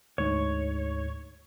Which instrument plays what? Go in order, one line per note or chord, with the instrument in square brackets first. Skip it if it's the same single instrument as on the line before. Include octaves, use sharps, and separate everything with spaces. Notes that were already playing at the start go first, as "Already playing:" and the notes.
[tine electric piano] D2 G#2 [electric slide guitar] C#5